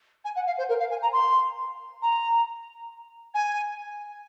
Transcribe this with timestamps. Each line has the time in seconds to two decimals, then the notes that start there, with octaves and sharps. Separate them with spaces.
0.24 G#5
0.35 F#5
0.46 F5
0.58 C5
0.68 A#4
0.79 F5
0.90 G#5
1.02 A#5
1.12 C6
2.01 A#5
3.34 G#5